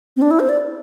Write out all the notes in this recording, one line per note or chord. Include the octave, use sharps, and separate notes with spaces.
C4
D4
E4
C5
D5